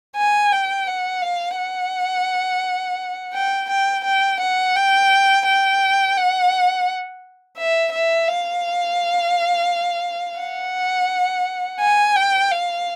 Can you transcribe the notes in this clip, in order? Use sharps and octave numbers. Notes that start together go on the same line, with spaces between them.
G#5
G5
F#5
F5
F#5
G5
G5
G5
F#5
G5
G5
F#5
E5
E5
F5
F#5
G#5
G5
F5